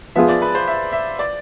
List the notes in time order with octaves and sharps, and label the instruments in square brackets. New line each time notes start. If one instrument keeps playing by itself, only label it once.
[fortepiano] F3 B3 F4 G#4 [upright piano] E5
[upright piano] D5
B4
C5
E5
E5
D5